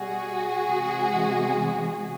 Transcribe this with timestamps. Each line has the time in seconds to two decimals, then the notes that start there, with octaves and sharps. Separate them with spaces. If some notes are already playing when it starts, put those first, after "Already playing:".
Already playing: B2 G3 F#4 G#4
0.67 C3 E3 G#3